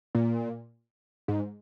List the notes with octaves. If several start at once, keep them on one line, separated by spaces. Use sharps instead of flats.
A#2
G#2